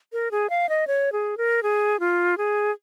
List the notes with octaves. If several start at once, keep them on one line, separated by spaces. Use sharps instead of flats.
A#4
G#4
F5
D#5
C#5
G#4
A#4
G#4
F4
G#4